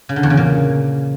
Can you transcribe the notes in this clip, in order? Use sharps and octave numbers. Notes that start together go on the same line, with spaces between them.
C#3
D3
E2
C#3
A#2